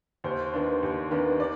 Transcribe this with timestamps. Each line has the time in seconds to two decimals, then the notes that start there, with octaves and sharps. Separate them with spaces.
0.24 D#2 C5
0.54 D#3 B3 D4
0.83 D#2
1.11 D#3 B3 D4
1.40 D5